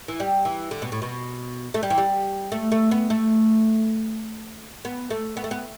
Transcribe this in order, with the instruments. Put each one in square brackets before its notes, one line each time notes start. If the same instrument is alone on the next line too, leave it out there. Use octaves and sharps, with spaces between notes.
[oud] E3
G3
E3
D3
B2
A2
B2
A3
G3
E3
G3
A3
A3
B3
A3
B3
A3
B3
A3
B3